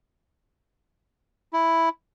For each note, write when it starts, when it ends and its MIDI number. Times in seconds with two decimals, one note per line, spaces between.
1.53 1.89 64